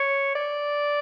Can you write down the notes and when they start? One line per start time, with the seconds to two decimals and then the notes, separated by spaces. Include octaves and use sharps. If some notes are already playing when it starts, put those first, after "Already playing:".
Already playing: C#5
0.35 D5